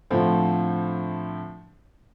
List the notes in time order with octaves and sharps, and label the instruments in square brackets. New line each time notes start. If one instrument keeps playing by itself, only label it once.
[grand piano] A2 D3 F3 C4